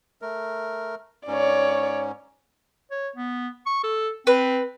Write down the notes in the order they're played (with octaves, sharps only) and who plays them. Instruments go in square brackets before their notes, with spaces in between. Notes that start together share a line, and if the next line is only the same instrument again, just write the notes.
[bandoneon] A3 A#4
[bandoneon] G#2 C#4 [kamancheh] C#5 D5
[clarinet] C#5
B3
C#6
A4
[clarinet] C4 [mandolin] B4